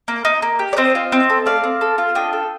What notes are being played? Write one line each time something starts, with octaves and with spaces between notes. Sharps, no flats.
A#3
D#4
A#3
G4
D5
C4 C5 D#5
F4
C4
A4
A3 D5 F5
C4
A4
F4
D4 D#5 G5
A4